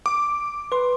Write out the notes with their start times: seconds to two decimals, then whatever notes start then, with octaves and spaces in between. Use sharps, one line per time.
0.06 D6
0.72 B4 C6